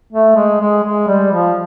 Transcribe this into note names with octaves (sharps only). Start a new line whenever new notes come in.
A3
G#3
G#3
G#3
G3
F3